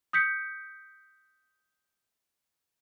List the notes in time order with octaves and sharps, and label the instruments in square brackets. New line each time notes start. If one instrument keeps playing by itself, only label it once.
[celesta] D#6 G6 B6 C#7